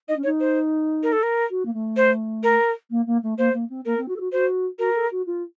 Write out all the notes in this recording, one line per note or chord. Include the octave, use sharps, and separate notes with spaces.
D#4 D#5
C#4
D#4 C#5
C5
A#4
A4
A#4
F#4
A#3
A3
C5
A#4
A#3
A#3
A3
A#3 C5
A#3
C4
A#3 A#4
C4
F#4
A4
F#4
F#4 C5
F#4 A#4
A4
F#4
F4